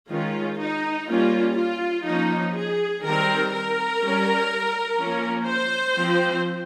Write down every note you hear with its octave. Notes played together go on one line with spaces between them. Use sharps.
D#3 G#3 C#4 F4
D#4
G3 A#3 C#4 F4
F4
F3 A#3 C#4 D#4
G#4
D#3 G3 C4 A#4
A#4
G3 C#4
F3 A#3 C#4
C5
F3 C4